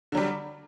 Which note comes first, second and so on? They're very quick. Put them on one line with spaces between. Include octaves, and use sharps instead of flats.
D3 F#3 G3